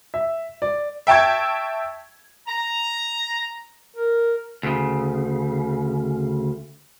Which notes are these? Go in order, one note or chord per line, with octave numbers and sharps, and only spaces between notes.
E5
D5
E5 G5 A5 C#6 G#6
A#5
A#4
D2 C#3